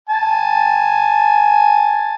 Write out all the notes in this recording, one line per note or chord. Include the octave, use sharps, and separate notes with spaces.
G#5 A5